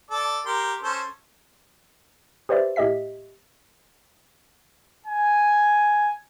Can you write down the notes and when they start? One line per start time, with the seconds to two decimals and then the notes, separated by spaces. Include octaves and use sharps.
0.10 A4 D5
0.46 G4 A#4 C6
0.84 C#4 A4 C5
2.49 G4 B4 C5 D5 E5
2.76 A2 G4 D#5 E5 B6
5.06 G#5